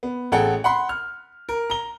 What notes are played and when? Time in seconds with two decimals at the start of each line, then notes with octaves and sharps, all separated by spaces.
0.03 B3
0.32 A1 G#4 A4 F#5 G5
0.64 F#5 B5 C6
0.89 F6
1.49 A#4
1.70 A#5 G7